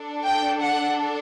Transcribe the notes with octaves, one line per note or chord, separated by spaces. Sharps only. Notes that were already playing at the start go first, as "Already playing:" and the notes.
Already playing: D4 A4
G5
F#5